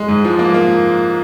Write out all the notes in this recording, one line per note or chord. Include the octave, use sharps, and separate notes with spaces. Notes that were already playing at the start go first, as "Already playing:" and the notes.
Already playing: G#3
G#2
F3
A#3
A#3